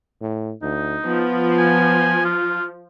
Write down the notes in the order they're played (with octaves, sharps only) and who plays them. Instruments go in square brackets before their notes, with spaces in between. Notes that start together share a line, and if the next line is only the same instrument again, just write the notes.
[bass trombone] A2
[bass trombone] D2 [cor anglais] D#4
[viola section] F3 [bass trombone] B3
[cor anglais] G#5
F4